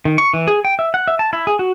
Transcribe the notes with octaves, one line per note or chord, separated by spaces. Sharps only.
D#3
C#6
E3
G#4
G5
E5
F#5
E5
A5
E4
G#4
F#4